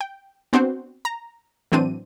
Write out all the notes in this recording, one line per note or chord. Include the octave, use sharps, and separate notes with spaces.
G5
B3 C4 D4 F#4 C5
A#5
A2 E3 F#3 C4 D4 D#7